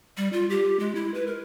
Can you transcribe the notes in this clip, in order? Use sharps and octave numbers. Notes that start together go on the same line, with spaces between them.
G3
F4
G4
G#3
E4
B4
A#4